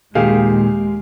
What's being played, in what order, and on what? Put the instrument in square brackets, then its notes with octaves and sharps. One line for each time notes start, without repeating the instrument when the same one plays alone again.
[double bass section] D#2 G#3 [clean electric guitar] A#2 D#3 [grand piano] G4 G#4 F5